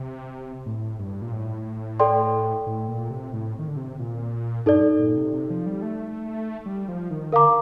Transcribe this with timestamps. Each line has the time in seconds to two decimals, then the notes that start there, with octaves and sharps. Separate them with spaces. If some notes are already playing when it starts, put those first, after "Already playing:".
Already playing: C3
0.66 A2
0.99 G2
1.22 A#2
1.33 A2
2.00 A4 D5 G5 C6
2.66 A2
2.88 A#2
3.10 C3
3.33 A2
3.59 D#3
3.68 D3
3.77 C3
3.99 A#2
4.66 G2 D#4 A4 D5
4.99 A#2
5.16 C3
5.33 C3
5.50 F3
5.66 G3
5.82 A3
6.66 G3
6.88 F3
7.10 D#3
7.32 D3 A#4 F5 A#5 D6